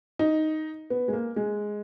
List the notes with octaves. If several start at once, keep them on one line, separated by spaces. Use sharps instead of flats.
D#4
B3
G#3
A#3
G#3